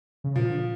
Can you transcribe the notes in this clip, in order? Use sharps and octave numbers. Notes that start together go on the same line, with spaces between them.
C#3
A#2 F3
D3